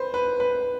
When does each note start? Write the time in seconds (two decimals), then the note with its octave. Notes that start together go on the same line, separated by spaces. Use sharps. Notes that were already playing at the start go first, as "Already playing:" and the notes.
Already playing: B4 C5
0.14 B4
0.40 B4